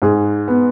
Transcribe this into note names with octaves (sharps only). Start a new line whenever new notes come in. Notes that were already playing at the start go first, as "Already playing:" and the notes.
G#2 G#4
B3